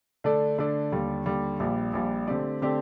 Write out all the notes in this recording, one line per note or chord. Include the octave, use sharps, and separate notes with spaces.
D3 A3 D4 A4 D5
D3 A3 D4 A4 D5
D#2 D3 G3
D#2 D3 G3
A#1 A#2 G3
A#1 A#2 G3
D3 A3 C4 G4 D5
D3 A3 C4 G4 D5